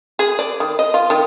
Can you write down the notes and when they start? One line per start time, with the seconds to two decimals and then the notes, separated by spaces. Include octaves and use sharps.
0.19 G#4
0.39 D5
0.60 D#3
0.79 D#5
0.94 F4
1.10 D#3